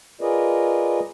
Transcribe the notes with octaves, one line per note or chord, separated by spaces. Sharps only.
F4 G#4 A#4 B4 D5 D#5